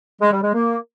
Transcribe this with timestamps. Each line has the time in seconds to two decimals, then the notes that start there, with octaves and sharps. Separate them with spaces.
0.21 G#3
0.32 G3
0.43 G#3
0.54 A#3